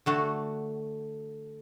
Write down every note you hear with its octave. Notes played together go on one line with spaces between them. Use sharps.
D3 A3 F#4